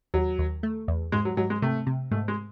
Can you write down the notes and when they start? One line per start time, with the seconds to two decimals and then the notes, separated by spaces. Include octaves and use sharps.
0.14 D#2 F#3
0.39 D#2
0.63 A3
0.88 E2
1.12 G#2 G#3
1.25 F#3
1.37 G#2 F#3
1.50 G#3
1.62 C3 A3
1.87 C3
2.11 G#2 A3
2.28 G#3